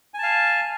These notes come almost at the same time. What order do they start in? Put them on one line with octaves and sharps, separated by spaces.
G#5 A5 F5